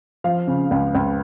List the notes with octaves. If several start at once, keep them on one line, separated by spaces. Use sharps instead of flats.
F3 F5
C#3
C#2
C#2